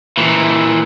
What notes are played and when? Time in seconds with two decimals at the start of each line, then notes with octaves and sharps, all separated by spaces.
0.17 A#2 E3